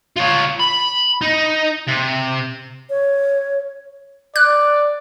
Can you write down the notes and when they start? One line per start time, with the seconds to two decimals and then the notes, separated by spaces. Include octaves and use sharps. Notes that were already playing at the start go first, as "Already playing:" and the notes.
0.16 F4 C#5
0.59 B5
1.21 D#4
1.88 C3
2.90 C#5
4.36 D5 F#6